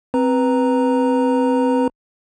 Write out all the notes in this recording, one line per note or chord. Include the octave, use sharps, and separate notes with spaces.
C4 B4 A#5